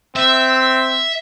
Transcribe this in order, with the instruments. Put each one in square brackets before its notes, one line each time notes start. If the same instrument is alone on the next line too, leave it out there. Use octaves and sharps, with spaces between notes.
[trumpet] C4 [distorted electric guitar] E5